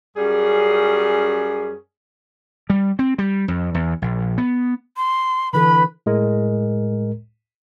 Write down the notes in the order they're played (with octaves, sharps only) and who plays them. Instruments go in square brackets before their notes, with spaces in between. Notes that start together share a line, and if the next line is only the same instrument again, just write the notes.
[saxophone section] F#2 G3 C#4 G#4
[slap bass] G3
C4
G3
F2
E2
A#1
B3
[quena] C6
[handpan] D3 E3 A4 [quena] B4 [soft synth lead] B5
[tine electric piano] A2 G#3 A#4